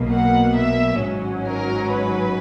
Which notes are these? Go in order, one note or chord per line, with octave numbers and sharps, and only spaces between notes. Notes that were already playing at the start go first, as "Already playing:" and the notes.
Already playing: B1 B2 A#3
F#5
E5
G#1 G#2 F#3 C#4
A#4
B4